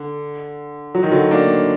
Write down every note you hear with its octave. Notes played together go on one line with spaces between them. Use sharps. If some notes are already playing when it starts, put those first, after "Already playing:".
Already playing: D3
F#3
D#3
D3 F#3
A#3 D4